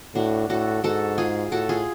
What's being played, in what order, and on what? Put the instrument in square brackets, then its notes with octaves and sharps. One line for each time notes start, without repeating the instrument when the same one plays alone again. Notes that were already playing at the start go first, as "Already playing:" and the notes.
[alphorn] A2 [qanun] D4 F#4
[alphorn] A2 [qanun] F#4 A4
[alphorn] G#2 [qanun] F#4 A4
[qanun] F4 G#4
[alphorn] A2 [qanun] F#4 A4
[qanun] F4 G#4